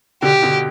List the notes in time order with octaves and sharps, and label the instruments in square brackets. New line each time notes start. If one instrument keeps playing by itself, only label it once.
[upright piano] B2 D3 [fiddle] G4
[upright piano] B2 D3